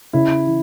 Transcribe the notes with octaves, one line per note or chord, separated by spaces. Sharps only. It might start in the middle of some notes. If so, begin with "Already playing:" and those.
C#3 E4
E3